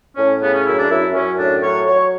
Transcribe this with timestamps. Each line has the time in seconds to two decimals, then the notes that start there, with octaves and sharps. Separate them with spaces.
0.16 A2 C#4
0.41 C#3 B3
0.53 C#4
0.65 F#2 E4
0.77 D4
0.89 F#2 E4
1.14 F#2 C#4
1.38 A2 D4
1.62 F#3 C#5
1.86 F#3 C#5